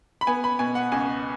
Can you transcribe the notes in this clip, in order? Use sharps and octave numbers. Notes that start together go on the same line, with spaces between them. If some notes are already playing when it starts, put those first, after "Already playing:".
B5
B3 G#5
B5
B2 G#5
F#5
C#2 G#5